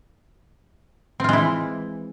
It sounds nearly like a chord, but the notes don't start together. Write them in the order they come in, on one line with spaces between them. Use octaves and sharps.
C4 F4 G#3 E4 E3